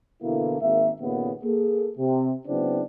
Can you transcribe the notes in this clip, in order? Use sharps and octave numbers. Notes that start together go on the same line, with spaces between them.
B2 D3 E3 A#3 E4 A4
G#1 A#3 E5
D#2 A#2 C#3 B3
A#3 G#4 A4
C3
C#3 F#3 B3 C4 D4 E4